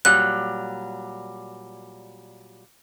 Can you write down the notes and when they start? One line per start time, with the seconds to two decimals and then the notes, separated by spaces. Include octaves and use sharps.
0.05 A#2 F#3 G3 F#6